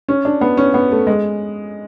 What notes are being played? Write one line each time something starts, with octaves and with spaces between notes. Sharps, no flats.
C#4
D4
B3
C#4
B3
A3
G#3